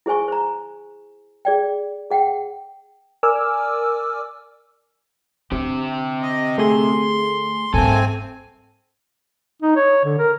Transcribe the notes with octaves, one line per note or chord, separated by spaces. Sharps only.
E4 G#4 C5 G#5 C#6
C5 A#5
G#4 D5 G5
G#4 F#5 G5
A#4 D5 G#5 D6 E6 F6
D3 C4 G4
D#5
A3 G#4 C6
G#2 G3 A#3 C4 A4 G#5
D#4
C#5
D3
A#4